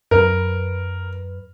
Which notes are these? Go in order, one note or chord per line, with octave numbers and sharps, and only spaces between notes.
F#2 A#4 B4